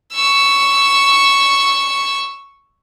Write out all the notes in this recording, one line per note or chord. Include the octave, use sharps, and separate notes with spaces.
C#6 E6